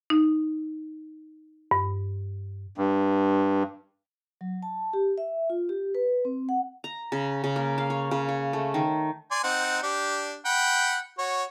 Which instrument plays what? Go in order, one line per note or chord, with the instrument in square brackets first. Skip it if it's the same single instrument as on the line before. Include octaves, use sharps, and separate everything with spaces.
[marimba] D#4
G2
[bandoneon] G2
[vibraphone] F#3
A5
G4
E5
F4
G4
B4
C4
F#5
[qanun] A#5
C#3
C#3
A#3
F5
C#5
C#3
C#5
A3
D#3
[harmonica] D5 G#5 C6
C4 D#4 F#5
D4 G4
F#5 G5 B5
F#4 C#5